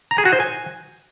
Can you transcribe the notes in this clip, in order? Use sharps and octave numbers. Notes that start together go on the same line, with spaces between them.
A#5
G#4
F#4
C5
G#5